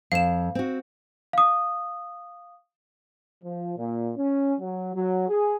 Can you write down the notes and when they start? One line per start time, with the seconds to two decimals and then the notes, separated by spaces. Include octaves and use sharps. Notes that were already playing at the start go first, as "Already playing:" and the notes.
0.12 F2 F5 E7
0.55 C4 F#4
1.33 F5 D#6
3.44 F3
3.78 A#2
4.17 C#4
4.60 F#3
4.95 F#3
5.29 G#4